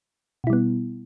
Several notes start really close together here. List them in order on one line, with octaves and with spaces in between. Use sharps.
B2 E4 G3 B3